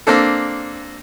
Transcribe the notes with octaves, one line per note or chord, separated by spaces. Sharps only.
A#3 C4 D4 A4